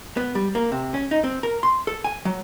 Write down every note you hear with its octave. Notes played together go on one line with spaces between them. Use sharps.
B3
G3
A#3
C3
C#4
D#4
C4
A#4
C6
A4
G#5
F#3